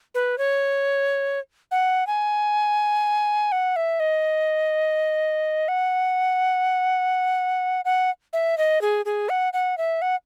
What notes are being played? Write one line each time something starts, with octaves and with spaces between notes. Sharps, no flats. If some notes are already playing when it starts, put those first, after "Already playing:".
B4
C#5
F#5
G#5
F#5
E5
D#5
F#5
F#5
E5
D#5
G#4
G#4
F#5
F#5
E5
F#5